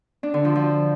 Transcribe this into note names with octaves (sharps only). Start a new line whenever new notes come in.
D4
D3
F3
F3